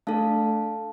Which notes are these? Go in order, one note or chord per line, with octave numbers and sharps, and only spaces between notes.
A3 D4 A4 F5 A5